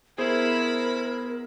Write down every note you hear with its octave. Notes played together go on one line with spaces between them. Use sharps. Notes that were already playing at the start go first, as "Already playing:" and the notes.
B3 E4 G#4 A#4 C5 B5